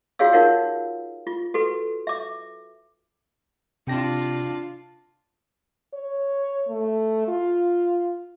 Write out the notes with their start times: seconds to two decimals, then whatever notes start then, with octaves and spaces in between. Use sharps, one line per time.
0.19 F4 F#4 G#4 C#5 F5 E6
0.33 D#4 F4 A#4 C#5 F5 F#5
1.27 F4
1.54 F#4 A4 B4
2.07 E5 D6
3.87 C3 D4 F4 G5 A#6
5.94 C#5
6.69 A3
7.28 F4